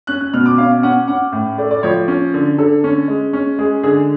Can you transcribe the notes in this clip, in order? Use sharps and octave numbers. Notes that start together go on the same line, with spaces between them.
C#4 F#6
F#6
B2 F6
D6
C#4 F5
C#4 F#5
C#4 F#5
A2
A3 D5
D5
F3 C#5
C#4
D3
D3 A4
C#4
G#3
C#4
G#3 G#4
D3 G#4